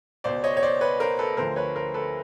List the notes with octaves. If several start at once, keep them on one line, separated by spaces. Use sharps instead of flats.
C#2 B2 C5 D5
C#5 D#5
C#5
C5 D5
B4 C#5
A#4 C5
A4 B4
D2 D3 F3 A#4 C5
B4 C#5
A#4 C5
A4 B4